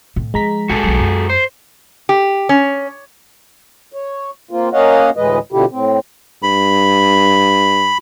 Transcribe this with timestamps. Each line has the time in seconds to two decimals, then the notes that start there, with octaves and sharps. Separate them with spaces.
0.16 A2
0.34 F3 G#3 A#5 B6
0.70 A#1 F#4 G#4 A4
0.83 B1 F#3
0.99 F#2
1.30 C5
2.09 G4
2.49 C#4
3.93 C#5
4.51 A#3 C4 F4
4.73 A#3 C#4 C#5 D#5 F5 F#5
5.16 D2 A2 E3 G#3 B4 D#5
5.52 B2 D3 F3 A3 E4 G4
5.71 A2 C4
6.43 G2 B5